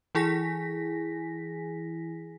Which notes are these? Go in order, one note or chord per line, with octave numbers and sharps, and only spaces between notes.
E3 E4 G#4 G#5 A#6 B6